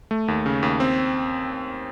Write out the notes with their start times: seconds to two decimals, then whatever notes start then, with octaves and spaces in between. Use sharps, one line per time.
0.11 A3
0.28 D#2
0.46 C#3
0.63 D#2
0.80 C4